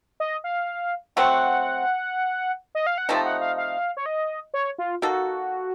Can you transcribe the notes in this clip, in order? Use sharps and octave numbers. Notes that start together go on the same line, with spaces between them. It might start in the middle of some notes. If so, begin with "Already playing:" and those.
D#5
F5
F#3 A3 C4 F#5
D#5
F5
F#5
C3 F3 A3 D#4 A5
F#5
F5
F5
C#5
D#5
C#5
F4
A#3 D#4 F#4 A4